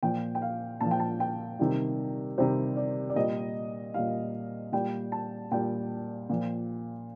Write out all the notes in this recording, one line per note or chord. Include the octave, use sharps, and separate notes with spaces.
A#2 F3 G5
G5
F5
A#2 F3 A5
G5
A5
G5
C3 D#3 G3
C3 D#3 G3 C5
D5
D5
A#2 G3 D#5
A#2 G3 F5
A#2 G3 G5
A5
A#2 G3 G5
A#2 F3